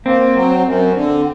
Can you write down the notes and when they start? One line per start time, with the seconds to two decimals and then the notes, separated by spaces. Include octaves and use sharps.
0.06 A#3 C4
0.34 F#3
0.64 F#2
0.93 D3